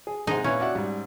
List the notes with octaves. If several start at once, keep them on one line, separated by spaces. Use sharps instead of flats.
G#4
C3 G#3 D#4 G#4 C5 F#5
A#2 C#4 E4 B4 C#5
F#4 D5 E5 F#5
G#2 G3